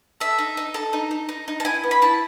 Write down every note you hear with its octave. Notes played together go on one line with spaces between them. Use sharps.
A4 E5
D#4
D#4
A4
D#4
D#4
D#4
D#4
A5
E4 G#5
B3
B5
E4 A5